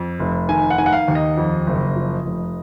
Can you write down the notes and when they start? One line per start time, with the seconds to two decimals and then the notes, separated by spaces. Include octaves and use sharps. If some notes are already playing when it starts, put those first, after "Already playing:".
Already playing: F2
0.20 F1
0.49 D#3 G#5
0.70 F#5
0.78 D#3 G#5
0.86 F#5
0.93 F5
1.08 D#2
1.15 D#5
1.37 F2
1.67 F#1
1.96 F3
2.25 F1